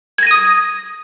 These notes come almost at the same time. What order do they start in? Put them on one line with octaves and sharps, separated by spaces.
G#6 A#6 D#7 D#6